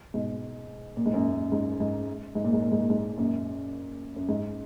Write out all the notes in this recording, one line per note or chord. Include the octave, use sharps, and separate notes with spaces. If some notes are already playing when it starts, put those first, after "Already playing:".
G#2 B2
A#2
G#2
F#2 A#2
G#2
G#2
G#2
A#2
G#2
A#2
G#2
A#2
G#2
F#2 A#2
F#2
G#2